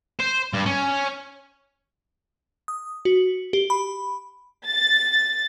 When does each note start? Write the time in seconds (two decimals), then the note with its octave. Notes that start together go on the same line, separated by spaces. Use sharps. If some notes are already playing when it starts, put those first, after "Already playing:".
0.20 C5
0.54 G2
0.66 C#4
2.68 D#6
3.05 F#4
3.53 G4
3.70 B5
4.68 A6